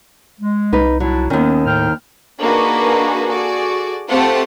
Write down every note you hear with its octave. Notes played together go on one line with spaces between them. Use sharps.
G#3
C2 D#4 B4
F#3 D4 E4
D#2 D#3 B3 C#4
A2 C5 G5 F6
A#3 D4 D#4 F#4 G#4 B4
F#4 G#4 A4 D5
A3 C4 F4 G4 F#5 A5